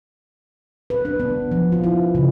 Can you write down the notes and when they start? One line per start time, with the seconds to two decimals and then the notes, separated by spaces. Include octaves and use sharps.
0.90 B4
1.05 D4
1.20 B3
1.51 F3
1.72 F4
1.84 E4
2.15 C#3